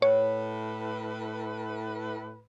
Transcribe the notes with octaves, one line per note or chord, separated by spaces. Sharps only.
A2 B4 C#5